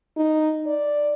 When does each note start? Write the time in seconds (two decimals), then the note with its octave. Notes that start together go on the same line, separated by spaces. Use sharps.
0.17 D#4
0.67 D5